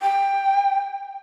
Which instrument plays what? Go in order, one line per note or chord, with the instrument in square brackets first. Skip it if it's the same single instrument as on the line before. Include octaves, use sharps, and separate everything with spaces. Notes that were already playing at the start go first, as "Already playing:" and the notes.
[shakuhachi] G5